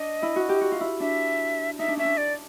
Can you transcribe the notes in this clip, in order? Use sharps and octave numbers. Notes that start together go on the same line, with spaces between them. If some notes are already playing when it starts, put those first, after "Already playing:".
Already playing: D4 D#5
E4
F#4
G4
F#4
F4
E4
D4 E5
D#4 E5
D4
C#4 E5
D4
D5